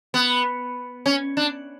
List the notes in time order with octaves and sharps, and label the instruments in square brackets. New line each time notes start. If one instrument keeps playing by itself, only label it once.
[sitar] B3
C#4
D4